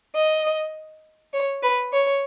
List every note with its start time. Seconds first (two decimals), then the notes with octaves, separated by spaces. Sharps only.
0.15 D#5
1.34 C#5
1.63 B4
1.93 C#5